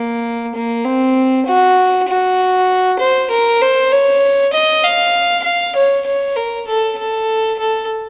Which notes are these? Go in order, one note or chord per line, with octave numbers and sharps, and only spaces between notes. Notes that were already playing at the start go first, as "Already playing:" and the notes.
Already playing: A#3
A#3
C4
F#4
F#4
C5
A#4
C5
C#5
D#5
F5
F5
C#5
C#5
A#4
A4
A4
A4